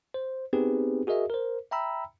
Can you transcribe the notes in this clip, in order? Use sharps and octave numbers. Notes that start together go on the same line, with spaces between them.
C5
B3 C4 D#4 G4 G#4 B4
F#4 G#4 A#4 D#5 E5
A#4 C5
E5 G5 A#5 B5 E6